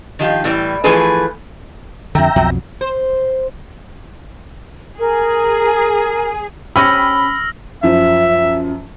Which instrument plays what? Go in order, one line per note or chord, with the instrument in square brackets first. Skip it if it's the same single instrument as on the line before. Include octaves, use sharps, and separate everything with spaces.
[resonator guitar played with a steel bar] D#3 F3 G4 F5
A2 E3 G3
E3 F3 A3 G#4 B4
[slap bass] F2 D3 [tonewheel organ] E5 G5 A#5
[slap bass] B1 F2 F#3
[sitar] C5
[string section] G#4 [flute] A#4
[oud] C#4 G4 [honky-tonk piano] B5 [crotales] E6 F6 A#6
[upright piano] F#2 F3 [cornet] E5